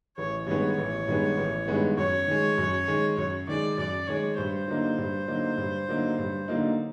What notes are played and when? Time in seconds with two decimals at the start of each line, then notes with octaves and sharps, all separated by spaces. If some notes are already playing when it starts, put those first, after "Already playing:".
0.17 A1 C#5
0.47 G2 D#3 G#3 B3 C#5
0.78 A1
1.08 G2 D#3 G#3 B3
1.37 A1
1.68 G2 D#3 G#3 B3
1.97 F#2 C#5
2.27 D#3 G#3
2.58 F#2
2.88 D#3 G#3
3.17 F#2 C#5
3.48 D#3 G#3 D5
3.78 F#2 D5
4.07 D#3 G#3 C#5
4.38 G2 C5
4.68 D3 F#3 A#3 D#4
4.98 G2
5.28 D3 F#3 A#3 D#4
5.57 G2
5.88 D3 F#3 A#3 D#4
6.18 G2
6.48 D3 F#3 A#3 D#4